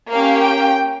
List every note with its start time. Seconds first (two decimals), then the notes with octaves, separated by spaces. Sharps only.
0.11 A#3 C#4 G4 F5
0.43 G5